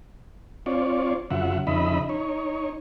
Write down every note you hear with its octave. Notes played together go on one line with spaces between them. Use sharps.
C4 F4 C#5 D5
F#2 C#3 F4 E5 F#5
F2 C#3 D#4 D#5 E5 B5
D#4 C#5